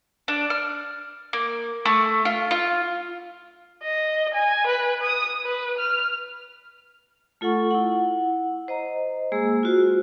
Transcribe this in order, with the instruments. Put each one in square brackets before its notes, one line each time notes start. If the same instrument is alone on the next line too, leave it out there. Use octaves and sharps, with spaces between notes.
[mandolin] D4
F6
A#3
A3
F4
F4
[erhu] D#5
G#5
B4
D#6
B4
F6
[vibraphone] A3 F4 A4 F#5 C#6
E4 F#5
C5 D#5 A#5
G#3 A#3 G#4 E6
F4 F#4 C5